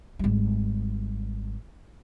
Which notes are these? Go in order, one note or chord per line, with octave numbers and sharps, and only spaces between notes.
G#1 G3